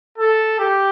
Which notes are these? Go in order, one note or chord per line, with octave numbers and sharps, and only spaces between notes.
A4
G4